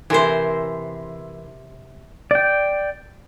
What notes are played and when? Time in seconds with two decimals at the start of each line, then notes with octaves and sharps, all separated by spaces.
0.10 C3 E3 A#4 C5
2.31 D5 G5